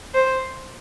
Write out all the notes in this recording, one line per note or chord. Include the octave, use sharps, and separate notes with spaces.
C5